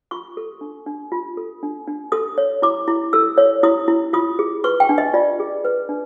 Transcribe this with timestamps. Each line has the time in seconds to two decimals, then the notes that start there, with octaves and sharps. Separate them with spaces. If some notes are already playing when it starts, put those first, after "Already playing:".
0.11 F4 C#6
0.37 A4
0.61 D4
0.86 D4
1.12 F4
1.37 A4
1.63 D4
1.87 D4
2.12 A4 D#6
2.38 C#5
2.62 E4 D6
2.88 E4
3.13 A4 E6
3.38 C#5
3.63 E4 D#6
3.88 E4
4.13 F4 D#6
4.39 G#4
4.64 B4 C#6
4.80 G5
4.89 D4
4.98 D#5
5.13 F4 D5
5.40 G#4
5.65 B4
5.89 D4